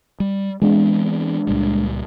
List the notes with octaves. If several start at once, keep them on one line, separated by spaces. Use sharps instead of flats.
G3
E3 G#3 B3 C4 D4
C#2 A#2 G3